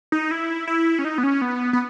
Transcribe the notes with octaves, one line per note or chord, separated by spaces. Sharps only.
D#4
E4
E4
C#4
D#4
B3
C#4
B3
B3